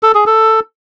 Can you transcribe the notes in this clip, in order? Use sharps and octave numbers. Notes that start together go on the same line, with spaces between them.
A4
G#4
A4